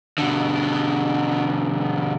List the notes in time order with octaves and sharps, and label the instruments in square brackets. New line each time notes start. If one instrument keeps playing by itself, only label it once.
[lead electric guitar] B2 D3